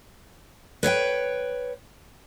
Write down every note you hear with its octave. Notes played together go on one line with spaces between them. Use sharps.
B4 C#5 E5 G5